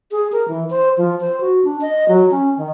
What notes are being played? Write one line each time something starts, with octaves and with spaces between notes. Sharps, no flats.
G#4
A#4
E3
C5
F3
C5
F#4
D4
D#5
F#3
C#4
D#3